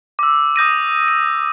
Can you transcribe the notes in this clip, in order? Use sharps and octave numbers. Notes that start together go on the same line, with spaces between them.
D6 E6
D#6 G6 A#6 D#7
D#7